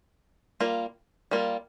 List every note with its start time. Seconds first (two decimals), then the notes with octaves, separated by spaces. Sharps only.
0.60 G3 A#3 F4
1.31 G3 A#3 F4